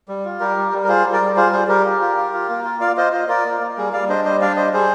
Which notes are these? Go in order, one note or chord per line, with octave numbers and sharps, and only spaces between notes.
G3
F4
G3 G4 A#4
G3
G3
A#4
F4 G#4 C5
G3
A#4 D5
G3
F4 G#4 C5
G3 G#4 C5
G3 G4 A#4
F4
F4
F4
F4
A#3
F4
F4 D5 F5
F4 C5 D#5
F4 C5 D#5
F4 A#4 D5
A#3
A#3
G3 G#4
G3 D5 F5
D4 C5 D#5
G3 C5 D#5
D4 D5 F5
G3 C5 D#5
G3 G#4 C5